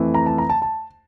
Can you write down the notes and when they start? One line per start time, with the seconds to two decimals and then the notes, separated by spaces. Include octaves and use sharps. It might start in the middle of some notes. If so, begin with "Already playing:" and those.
Already playing: F2 E3 A3
0.14 A#5
0.26 A5
0.38 A#5
0.50 A5
0.62 A5